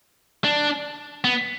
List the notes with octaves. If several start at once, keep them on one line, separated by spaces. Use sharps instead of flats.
D4
B3